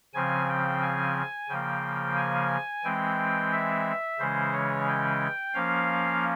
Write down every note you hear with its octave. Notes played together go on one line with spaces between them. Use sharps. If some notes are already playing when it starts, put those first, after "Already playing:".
C#3 F3 C4 G#5
G5
G#5
C#3 F3 A#3 G5
G#5
E3 G#3 C4 G5
E5
C#3 E3 G#3 C#4 C5
C#5
G5
F3 A#3 C#4 F5